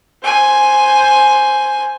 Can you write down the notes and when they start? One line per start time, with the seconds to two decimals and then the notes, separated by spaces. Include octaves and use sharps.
0.23 C5 G#5